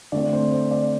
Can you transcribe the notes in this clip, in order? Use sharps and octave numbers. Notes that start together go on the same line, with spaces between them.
D3 A3 C4 D5
C5
C5
D5